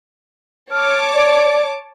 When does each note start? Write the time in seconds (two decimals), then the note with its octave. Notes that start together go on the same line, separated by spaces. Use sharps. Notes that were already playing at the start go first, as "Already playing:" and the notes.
0.72 C#5 A5 D6 F6
1.14 D5